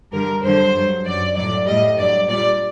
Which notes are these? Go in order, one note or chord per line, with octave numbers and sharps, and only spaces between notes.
G2 D3 G3 A#4
G2 D3 F#3 C5
G2 F#3
F#2 F#3 D5
A2 F#3 D5
A2 G3 D#5
G2 F#3 D5
A#2 G3 D5